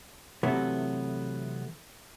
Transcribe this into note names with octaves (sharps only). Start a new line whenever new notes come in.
C3 E3 F#3 A3 B3